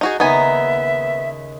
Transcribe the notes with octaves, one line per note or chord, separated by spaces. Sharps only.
D#4 F#4 G#4
D#2 C#3 B3 D#4 E5 G#5 A#5